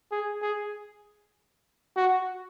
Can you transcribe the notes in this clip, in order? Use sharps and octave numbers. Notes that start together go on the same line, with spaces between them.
G#4
G#4
F#4